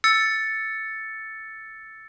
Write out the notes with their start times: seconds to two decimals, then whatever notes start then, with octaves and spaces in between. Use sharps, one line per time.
0.04 E6 A6 C#7